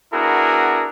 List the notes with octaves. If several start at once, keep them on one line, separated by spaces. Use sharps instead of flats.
B3 D4 E4 F#4 G#4 A#4